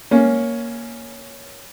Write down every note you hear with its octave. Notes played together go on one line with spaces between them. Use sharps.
A#3 C#4